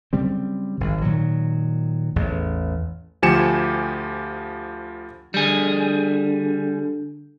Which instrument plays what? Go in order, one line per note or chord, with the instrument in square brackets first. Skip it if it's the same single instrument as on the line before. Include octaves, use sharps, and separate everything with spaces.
[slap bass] C#3 F#3 G3 C4
G#1 G2
A#2 D#3 F#3
A1 E2
[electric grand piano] D2 F3 G4 G#5 C#7 E7
[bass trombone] D3 [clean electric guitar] G3 G#4